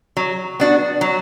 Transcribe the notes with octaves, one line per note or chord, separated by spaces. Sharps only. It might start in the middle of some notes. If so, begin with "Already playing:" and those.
F#3
B3 D4 F#4
F#3